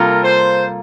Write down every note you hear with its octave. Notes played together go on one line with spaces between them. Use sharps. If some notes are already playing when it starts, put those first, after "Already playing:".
Already playing: C3 G3 A#3 F4 A4 A#4
C5